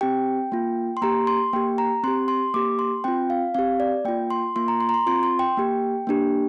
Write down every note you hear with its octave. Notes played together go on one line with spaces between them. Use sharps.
C4 G4 G5
A#3 F4
C6
A#3 G4 A#5
C6
A#3 G4 G5
A#5
C4 G4 C6
C6
A#3 G4 D6
C6
C4 F4 G5
F5
C4 G4 F5
D5
A#3 F4 G5
C6
A#3 F4 C6
A#5
C6
A#5
C6
C4 F4 C6
C6
G5
A#3 G4
A#3 D4 G4